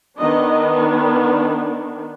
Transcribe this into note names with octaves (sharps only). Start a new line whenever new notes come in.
D#3 B3 D4 D#5